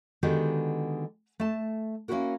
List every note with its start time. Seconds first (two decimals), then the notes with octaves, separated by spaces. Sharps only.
0.23 D3 D#3 G#3 B3 F#4 G4
1.40 A3 A5
2.08 A#3 C#4 D#4 E4 F#4 A#4